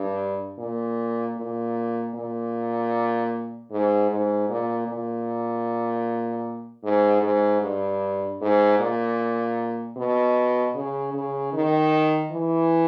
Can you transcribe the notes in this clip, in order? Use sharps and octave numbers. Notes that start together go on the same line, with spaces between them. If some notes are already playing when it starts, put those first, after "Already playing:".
Already playing: G2
A#2
A#2
A#2
G#2
G#2
A#2
A#2
G#2
G#2
G2
G#2
A#2
B2
C#3
C#3
D#3
E3